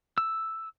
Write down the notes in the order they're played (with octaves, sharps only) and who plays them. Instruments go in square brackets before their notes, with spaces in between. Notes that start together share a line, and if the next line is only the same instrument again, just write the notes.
[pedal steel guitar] E6